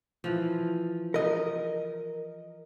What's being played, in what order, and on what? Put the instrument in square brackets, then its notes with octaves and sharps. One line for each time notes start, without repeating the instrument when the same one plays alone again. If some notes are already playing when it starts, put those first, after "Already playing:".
[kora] E3 F3
[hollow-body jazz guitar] A#4 D#5